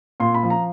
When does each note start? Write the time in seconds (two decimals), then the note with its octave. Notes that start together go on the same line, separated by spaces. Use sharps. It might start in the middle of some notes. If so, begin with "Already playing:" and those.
0.20 A#2 C6
0.34 B5
0.43 F3
0.50 A#5